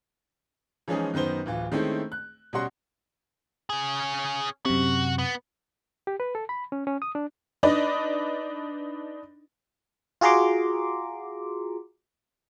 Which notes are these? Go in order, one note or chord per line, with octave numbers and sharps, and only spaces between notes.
E3 F3 G#3 C#4 D#4 G#4
F#2 D#3 B3 C5 G7
D1 E3 F4
D#3 G#3 A3 C4 C#4 E4
F#6
B2 G3 C#4 F#4 F#5 C6
C#4 G#4
F#2 C3 F#4
B3
G4
B4
A4
B5
C#4
C#4
D#6
D4
D4 D#4 B4 D5 D#5
F4 F#4 G#4 A#5 C6 D6